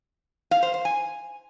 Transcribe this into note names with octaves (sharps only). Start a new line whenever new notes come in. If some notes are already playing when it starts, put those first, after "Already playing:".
F5
C5
C5
G#5